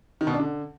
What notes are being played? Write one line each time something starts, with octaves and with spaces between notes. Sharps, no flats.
D#3
B2
D4
D3